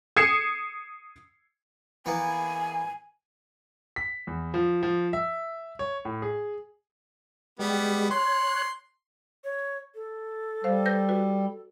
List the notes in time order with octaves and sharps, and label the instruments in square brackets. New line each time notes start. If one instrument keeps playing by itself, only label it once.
[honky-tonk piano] D#6 G#6 C7 C#7 E7
[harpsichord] E3 A#3 B3 [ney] G#5
[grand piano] B6
E2
F3
F3
E5
C#5
A2
G#4
[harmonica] G3 B3 [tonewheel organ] G#3 G4
[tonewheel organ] C#5 F#6 [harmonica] C6
[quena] C#5
A4
[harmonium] G3 [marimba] C5 F5
[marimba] B4 G6 A#6
F#4 B4